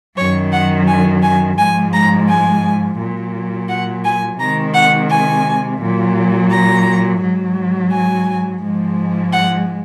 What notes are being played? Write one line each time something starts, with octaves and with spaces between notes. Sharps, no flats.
F#2 D#3 F#3 C#5
F#5
G#5
G#5
G#2 F3 G#3 G#5
A#5
G#5
A#2 F#3
F#5
G#5
C3 D#3 G#3 A#5
F#5
G#5
A#2 F#3
A#5
G#2 F#3
G#5
G#2 F3 G#3
F#5